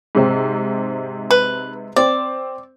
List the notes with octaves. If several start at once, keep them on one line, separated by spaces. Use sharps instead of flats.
G#2 C3 C4
B4
C4 D5